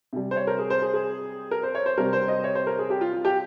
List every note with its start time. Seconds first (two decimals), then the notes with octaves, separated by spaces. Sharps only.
0.13 C3 G3
0.31 C5
0.36 C#5
0.47 A#4
0.59 G#4
0.70 C5
0.82 G#4
0.94 G#4
1.51 A#4
1.63 C5
1.75 C#5
1.86 C5
1.98 C3 G3 A#4
2.13 C5
2.28 D#5
2.44 C#5
2.55 C5
2.67 A#4
2.79 G#4
2.90 G4
3.01 F4
3.14 F4
3.25 G4